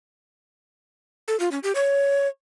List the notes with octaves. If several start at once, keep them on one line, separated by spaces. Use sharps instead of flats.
A4
F4
C#4
G4
C#5